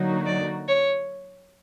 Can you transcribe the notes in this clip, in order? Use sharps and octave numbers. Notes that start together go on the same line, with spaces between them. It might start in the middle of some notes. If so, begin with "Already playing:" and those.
Already playing: D3 F#3 A#3 D#4 F#4
D5
C#5